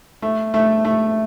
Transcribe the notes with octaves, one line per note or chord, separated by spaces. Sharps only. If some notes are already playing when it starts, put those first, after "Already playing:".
A3
A3
A3